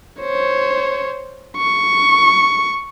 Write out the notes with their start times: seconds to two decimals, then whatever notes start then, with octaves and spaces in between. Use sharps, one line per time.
0.21 C5 C#5
1.57 C#6